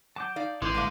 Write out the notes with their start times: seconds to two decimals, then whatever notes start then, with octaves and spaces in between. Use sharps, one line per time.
0.16 F#3 A5 D6 G6
0.36 D#4 D5 F5
0.62 A1 E3 G#3 D6 G6
0.75 D3 A3 A#3